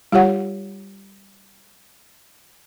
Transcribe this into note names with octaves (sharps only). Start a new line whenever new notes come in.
G3 F4 G4 C#5 F#5